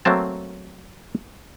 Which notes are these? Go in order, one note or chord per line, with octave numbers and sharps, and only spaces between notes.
F#3 A3 A#3 C4 A5